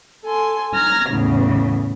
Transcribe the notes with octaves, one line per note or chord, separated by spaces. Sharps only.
A4 G#5 C6
A#5 F6 G#6 A#6
E2 A2 C#3